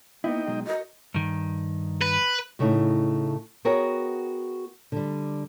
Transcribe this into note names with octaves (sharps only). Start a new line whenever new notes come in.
A#3 B3 D#4 E4 D#5 G5
B2 F#3 G#3
F#4 A#4 D#5
G2 D#3
B4
A2 C#3 A3 D#4 E4
B3 F#4 G#4 A#4 C#5 G5
D3 G3